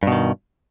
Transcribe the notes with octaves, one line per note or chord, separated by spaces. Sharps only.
G2 B2 D#3